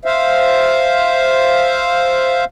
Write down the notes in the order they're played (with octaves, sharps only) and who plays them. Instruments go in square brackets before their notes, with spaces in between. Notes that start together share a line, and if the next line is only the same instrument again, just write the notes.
[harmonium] C5 E5 F5